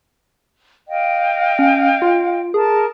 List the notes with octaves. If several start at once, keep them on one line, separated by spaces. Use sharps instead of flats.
D#5 F5 G5
C#4
F4
G#4 A#4 A5